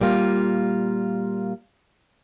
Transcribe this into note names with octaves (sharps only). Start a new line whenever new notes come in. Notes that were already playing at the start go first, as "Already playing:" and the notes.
A#2 G3 A#3 F4